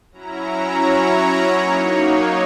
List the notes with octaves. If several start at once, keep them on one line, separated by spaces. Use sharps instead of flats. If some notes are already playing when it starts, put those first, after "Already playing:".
F#3 C#4 E4 A#5
C#5
F#3 A#3 D#4